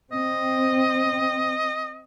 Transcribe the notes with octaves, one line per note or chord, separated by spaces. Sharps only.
C4 D#5